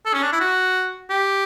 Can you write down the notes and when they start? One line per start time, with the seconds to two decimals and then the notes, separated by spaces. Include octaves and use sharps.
0.06 A4
0.14 C#4
0.23 D4
0.32 E4
0.41 F#4
1.10 G4